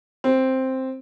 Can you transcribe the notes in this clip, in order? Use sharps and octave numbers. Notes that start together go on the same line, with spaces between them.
C4